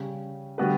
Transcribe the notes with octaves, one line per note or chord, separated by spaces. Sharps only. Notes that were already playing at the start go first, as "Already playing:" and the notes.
Already playing: C#3 G3 C#4
D3 G3 B3 F#4 B4